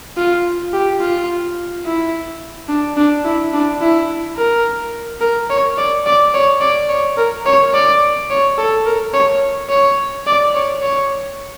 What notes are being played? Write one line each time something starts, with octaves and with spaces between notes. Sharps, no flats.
F4
G4
F4
E4
D4
D4
E4
D4
E4
A#4
A#4
C#5
D5
D5
C#5
D5
C#5
A#4
C#5
D5
C#5
A4
A#4
C#5
C#5
D5
C#5
C#5